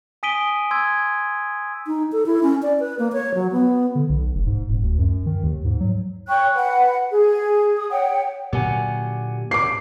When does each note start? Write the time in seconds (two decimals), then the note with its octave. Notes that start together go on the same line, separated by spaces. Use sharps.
0.23 G#5 D#6 B6 D7 D#7 G7
0.71 C6 E6 G#6
1.87 D#4
2.12 A4
2.26 E4
2.43 C#4
2.62 D5
2.80 B4
2.99 A#3
3.13 C#5
3.35 F#3
3.52 B3
3.95 D3
4.09 B1
4.35 F1
4.46 G#2
4.68 D#1
4.82 D2
4.98 F#2
5.26 D#3
5.43 D#2
5.65 G#2
5.80 F#3
6.28 C#5 G5 C#6 F#6
6.56 B4 F#5
7.11 G#4
7.76 D#6
7.91 C#5 F#5 G5
8.53 A#2 D3 F#3 G4 F#5 G#5
9.51 D6 C7